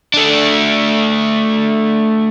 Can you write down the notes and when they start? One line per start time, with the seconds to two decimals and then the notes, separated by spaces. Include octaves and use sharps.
0.14 A3 D4